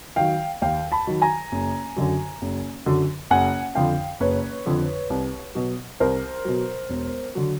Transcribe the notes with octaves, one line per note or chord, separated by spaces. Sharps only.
D#3 F#3 F5 G5
D#2 F5 G5
A5 B5
D#3 F#3
G#5 A#5
F#1
F#2 D3 F#3
F#1
F#2 D3 F#3
F#1 F#5 G#5
F2 D3 F3 F5 G5
F#1 B4 C#5
F2 D3 F3
C2
B2 F#3
C2 A#4 C5
B2 F#3
E1
D3 F#3